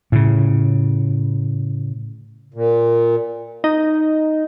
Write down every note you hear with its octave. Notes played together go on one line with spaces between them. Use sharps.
A2 C#3
A#2
D#4